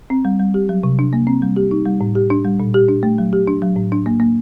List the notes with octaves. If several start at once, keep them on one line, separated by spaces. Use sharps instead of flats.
C4
G3
G3
G4
F#3
C3
D4
A#3
C4
G3
G4
D#4
G3
A2
G4
D4
G3
A#2
G4
D4
A3
F#3
G4
D4
F#3
A2
D4
A#3
A#3